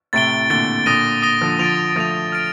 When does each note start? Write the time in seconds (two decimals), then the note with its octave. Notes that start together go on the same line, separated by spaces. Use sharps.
0.13 A2 C3 A6 D7 G7
0.50 A#2 D3 A6 D7 G7
0.86 A#2 D3 D#6 A#6 D#7 G7
1.22 D#6 A#6 D#7 G7
1.41 D3 F3
1.59 D3 F3 A6 D7 F7
1.96 F3 A3 A6 D7 F7
2.32 F6 A6 D7